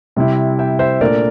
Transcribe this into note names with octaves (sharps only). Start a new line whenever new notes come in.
C3 G3 C4 E4
E5 G5
C5 E5
A#2 A3 D4 A#4 D5